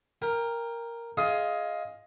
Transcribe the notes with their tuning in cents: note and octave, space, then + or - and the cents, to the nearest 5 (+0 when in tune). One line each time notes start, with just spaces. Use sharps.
A#4 +0 G5 +30
F4 +0 G#4 +15 D#5 +15